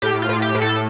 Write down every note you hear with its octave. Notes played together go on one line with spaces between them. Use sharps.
A2 G4
F4
A2
G4
A2
A4